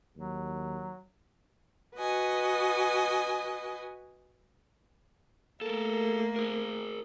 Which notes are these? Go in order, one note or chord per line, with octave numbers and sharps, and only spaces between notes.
D#2 F#3
F#4 B4 D#5 G#5
A3 A#3 A4 A#4
G#4 A#4